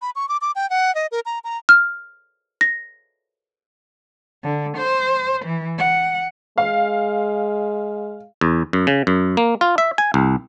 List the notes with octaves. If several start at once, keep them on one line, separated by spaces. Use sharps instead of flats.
B5
C#6
D6
D6
G5
F#5
D#5
A#4
A#5
A#5
F6
A#6
D3
C5
E3
F#5
G#3 F5
E2
F#2
C#3
F#2
A#3
F4
E5
G#5
C2